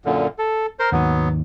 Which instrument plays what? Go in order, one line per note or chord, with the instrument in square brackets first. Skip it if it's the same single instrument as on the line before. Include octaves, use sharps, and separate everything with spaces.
[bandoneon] F#2 A#2 D3
A4
A#4 C5 C6
[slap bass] D#2 G#2 D#3 [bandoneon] F#3 B3